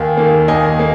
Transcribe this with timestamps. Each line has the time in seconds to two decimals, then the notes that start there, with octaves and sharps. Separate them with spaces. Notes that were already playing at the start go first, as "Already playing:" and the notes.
Already playing: D#2 G#5
0.17 D#3 A#3
0.48 D#2 D#5 G#5
0.79 A#3